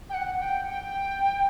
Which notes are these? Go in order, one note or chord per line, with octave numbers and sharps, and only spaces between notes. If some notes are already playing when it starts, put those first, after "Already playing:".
G5
F#5
G5
G5